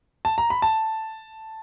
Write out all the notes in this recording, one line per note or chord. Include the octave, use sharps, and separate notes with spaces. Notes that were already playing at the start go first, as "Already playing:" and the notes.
A5
A#5
B5
A5